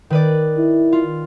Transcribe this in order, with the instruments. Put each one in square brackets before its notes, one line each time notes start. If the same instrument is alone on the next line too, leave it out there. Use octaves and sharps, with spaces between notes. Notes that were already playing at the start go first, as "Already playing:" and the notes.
[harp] D#3 B4 D5
[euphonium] E4
[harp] F4